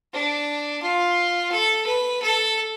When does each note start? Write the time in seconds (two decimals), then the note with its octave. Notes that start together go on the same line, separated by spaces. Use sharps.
0.13 D4
0.82 F4
1.52 A4
1.86 B4
2.22 A4